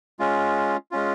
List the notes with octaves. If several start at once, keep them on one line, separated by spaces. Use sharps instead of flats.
G#3 C#4 F4
G#3 C#4 F4